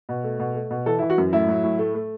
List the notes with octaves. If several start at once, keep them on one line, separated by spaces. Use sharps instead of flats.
B2
A3
B2
A3
B2
E3 A4
E3 E4
F#4
F#2
A2 E4
F#3
A2
A3
A3